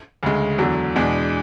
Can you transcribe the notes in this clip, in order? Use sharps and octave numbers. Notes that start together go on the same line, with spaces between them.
D2 C#3 G#3
E2 D3 F#3
E2 B2 G#3 D4